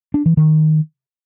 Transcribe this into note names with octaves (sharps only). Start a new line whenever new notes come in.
D4
E3
D#3